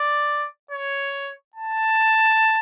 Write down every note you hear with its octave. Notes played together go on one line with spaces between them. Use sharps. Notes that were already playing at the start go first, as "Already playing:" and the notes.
Already playing: D5
C#5
A5